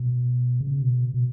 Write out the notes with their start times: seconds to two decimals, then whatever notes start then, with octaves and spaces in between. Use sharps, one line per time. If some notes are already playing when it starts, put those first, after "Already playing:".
Already playing: B2
0.61 C#3
0.82 B2
1.14 B2